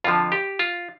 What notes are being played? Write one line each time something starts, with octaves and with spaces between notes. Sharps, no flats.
F2 D3 F3 F4
G4
F4